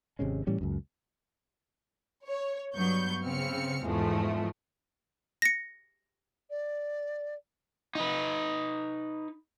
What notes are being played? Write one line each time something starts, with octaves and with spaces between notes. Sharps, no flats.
G#1 C3 G#3 C#4
A2 E3 G3 C#4
C#2 F#2
C#5
G2 F#3 B3 C#6 G6
C#3 B3 C4 F6 C#7
E2 G#2 F3 G#3 A3
A#6 C#7
D5
D#4 B4